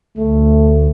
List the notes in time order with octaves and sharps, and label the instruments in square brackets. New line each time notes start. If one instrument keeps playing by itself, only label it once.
[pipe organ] D2 [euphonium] A3